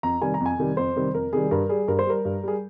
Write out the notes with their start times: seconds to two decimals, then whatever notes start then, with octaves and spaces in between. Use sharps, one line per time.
0.03 F2 A#5
0.21 C3 D#3 G3 G#5
0.34 A#5
0.40 F2
0.46 G#5
0.58 C3 D#3 G3
0.77 F2 C5
0.96 C3 D#3 G3
1.14 F2 A#4
1.33 C3 D#3 G3 G#4
1.51 G2 A#4
1.69 G3 G#4
1.88 G2 A#4
1.99 C5
2.06 G3 A#4
2.25 G2
2.43 G3 G#4